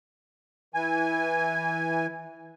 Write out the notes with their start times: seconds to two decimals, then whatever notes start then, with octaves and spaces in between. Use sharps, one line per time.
0.74 E3 G#5